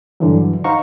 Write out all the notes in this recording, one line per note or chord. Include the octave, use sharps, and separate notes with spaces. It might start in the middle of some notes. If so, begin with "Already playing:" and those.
G2 D3 E3 F#3
D#4 C5 F5 F#5 A#5 C#6